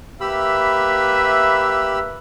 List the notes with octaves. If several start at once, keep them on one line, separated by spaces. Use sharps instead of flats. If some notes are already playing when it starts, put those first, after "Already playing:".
A#3 G4 B4 E5 B5 E6